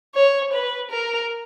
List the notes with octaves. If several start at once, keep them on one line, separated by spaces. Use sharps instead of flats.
C#5
B4
A#4